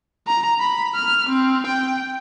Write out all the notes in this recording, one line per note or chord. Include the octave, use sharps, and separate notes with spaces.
A#5
B5
F6
C4
G5